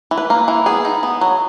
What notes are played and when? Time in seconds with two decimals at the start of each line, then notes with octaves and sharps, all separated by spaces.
0.11 E3
0.18 B4
0.30 A#3
0.48 E3
0.66 B3 G#4
0.85 D#4
1.03 B3
1.21 F#3